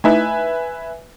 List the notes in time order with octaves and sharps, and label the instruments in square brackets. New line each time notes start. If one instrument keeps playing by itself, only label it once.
[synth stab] A3 D#4 E4 [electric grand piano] B4 E5 G#5